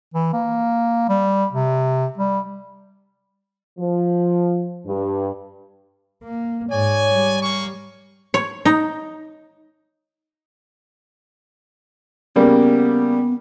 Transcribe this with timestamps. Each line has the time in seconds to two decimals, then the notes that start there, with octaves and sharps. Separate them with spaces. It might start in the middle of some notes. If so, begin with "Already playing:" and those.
0.14 E3
0.33 A#3
1.09 G3
1.53 C3
2.18 G3
3.79 F3
4.87 G2
6.23 A#3
6.70 G#2 C#5 D5 G#5
7.12 G3
7.42 A#3 C#6
8.34 C#5
8.65 D#4
12.36 C#3 G3 A#3 B3